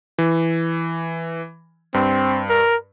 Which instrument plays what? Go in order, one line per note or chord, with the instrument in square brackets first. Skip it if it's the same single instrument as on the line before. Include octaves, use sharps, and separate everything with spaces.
[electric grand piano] E3
[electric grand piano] G2 [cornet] C4
[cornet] A#4